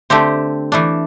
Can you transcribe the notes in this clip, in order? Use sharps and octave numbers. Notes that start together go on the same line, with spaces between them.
D3 A3 C4 G4
E3 A3 D4